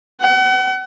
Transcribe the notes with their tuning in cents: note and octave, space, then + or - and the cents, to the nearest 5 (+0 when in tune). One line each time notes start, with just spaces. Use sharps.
F#5 +40